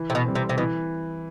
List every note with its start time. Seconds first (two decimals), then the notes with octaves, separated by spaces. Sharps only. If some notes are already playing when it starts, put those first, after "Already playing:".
Already playing: E3
0.10 C3
0.15 B2
0.25 G3 C4
0.35 C3
0.49 C3
0.57 B2 E3